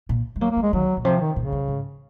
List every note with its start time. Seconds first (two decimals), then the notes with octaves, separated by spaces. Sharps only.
0.09 A#2
0.36 G#3
0.41 F#3 A#3
0.52 A#3
0.57 F3
0.63 G#3
0.73 D#3 F#3
0.97 A#2
1.05 C3 F3
1.21 D#3
1.36 A#2 C#3
1.52 F#2
1.68 G#2